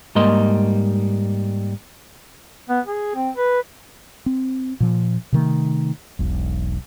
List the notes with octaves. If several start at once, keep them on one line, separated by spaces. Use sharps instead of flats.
G#2 G3 A#3 D#5 C6
B3
G#4
C4
B4
C4
A#2 F3
C3 D#3 A3
E1 B1